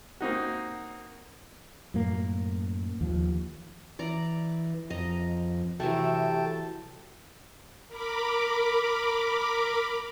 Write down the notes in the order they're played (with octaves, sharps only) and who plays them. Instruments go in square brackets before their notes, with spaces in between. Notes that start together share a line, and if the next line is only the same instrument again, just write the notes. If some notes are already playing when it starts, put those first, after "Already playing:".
[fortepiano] A#3 C4 D#4 F#4
[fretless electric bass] F#2 A2 A#3
D#2 F3
[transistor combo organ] E3 [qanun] D5 A#5
[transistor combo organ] F2 [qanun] D#5 A#5
[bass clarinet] C3 [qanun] E3 F#3 A3 [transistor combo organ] A4 G5 A5
[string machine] A#4 B5 D6